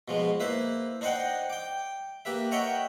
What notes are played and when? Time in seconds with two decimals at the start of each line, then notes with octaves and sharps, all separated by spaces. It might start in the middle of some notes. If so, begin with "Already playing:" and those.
0.08 B2 F3 G#3
0.40 A#3 E4 B4 C5
1.01 D4 D#4 C5 D#5 F#5 G5
1.50 G5 D6
2.25 A#3 G4 B4 E5
2.51 A#4 C#5 D#5 E5 F#5 G5